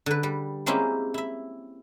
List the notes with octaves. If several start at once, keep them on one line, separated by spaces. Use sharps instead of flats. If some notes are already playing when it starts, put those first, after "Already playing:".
D3 B4
G3
G#3 A#3 C4 C#4 E4 G4
E4 E5